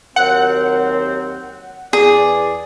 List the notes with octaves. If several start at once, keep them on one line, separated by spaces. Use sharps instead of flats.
D#2 F#3 C4 F#5
E2 G#4 D5